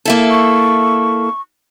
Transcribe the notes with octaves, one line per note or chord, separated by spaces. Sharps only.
A#3 E4 A4
C#6